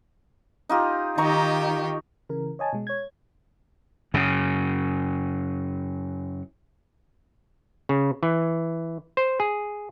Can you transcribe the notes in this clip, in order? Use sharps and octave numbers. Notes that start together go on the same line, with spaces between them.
D#4 F4 G4
D#3 D#4 G4 A#5 C#6
C#3 E3 A#4
C#5 D#5 G#5 A5
B2 G#3
C#5 G#6
F#2 C#3
C#3
E3
C5
G#4